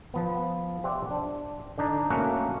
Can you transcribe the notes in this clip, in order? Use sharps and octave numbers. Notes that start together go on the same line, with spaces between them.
F3 B3
G4 C5 D5 E5 F#5
D4
D3 D4 D#4
A3 A#3 C#4 F#4 F#5